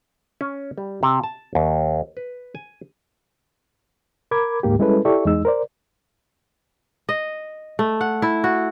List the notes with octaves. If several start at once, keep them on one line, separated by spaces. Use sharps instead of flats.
C#4
G3
C3
A5
D#2
B4
G#5
A#4 B5 D6 G#6
D2 G#2 A#3 G4
G3 G#3 C#4 E4 A4 B4
E4 G4 A4 D5 E5 C#6
E2 G#3 D#4 E6
A#4 C5 D5
D#5
A3
F#5
E4
F#4